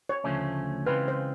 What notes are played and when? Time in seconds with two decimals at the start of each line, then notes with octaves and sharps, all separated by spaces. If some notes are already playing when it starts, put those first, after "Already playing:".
0.09 C#5
0.24 D2 C#3 F3 A3 C#4
0.86 C#3 E3 G#3 C4 F4 B4
1.08 C5